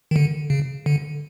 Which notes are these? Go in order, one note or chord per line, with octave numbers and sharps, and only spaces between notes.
D#3
D3
C#3
D3